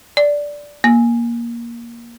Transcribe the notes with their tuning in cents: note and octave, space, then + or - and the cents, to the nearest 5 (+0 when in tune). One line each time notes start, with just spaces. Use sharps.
D5 -5
A#3 +15